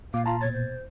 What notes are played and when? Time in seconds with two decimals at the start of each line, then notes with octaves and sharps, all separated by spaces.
0.14 A#2 F5 D6
0.26 F4 A5 A#5 C6
0.41 B2 C#5 G#6 A6
0.53 C5